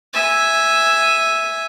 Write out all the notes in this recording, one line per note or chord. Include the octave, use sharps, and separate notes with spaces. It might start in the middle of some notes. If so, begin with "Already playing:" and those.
E5 G#5